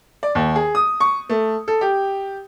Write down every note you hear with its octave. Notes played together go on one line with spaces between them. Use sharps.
D5
D#2
G#4
D#6
C#6
A3
A4
G4